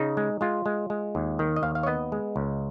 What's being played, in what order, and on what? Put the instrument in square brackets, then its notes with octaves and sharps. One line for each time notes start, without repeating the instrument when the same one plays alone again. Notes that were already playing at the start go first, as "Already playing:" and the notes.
Already playing: [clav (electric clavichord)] C#3 D#4
G#3
G#3 F4
G#3
G#3
D#2
D#3
D#5
D#2 F5
F5
C#5
B3 D#5
G#3
C#2